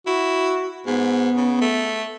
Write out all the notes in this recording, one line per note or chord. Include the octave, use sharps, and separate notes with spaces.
E4 F#4
G#2 B3
C#3
A3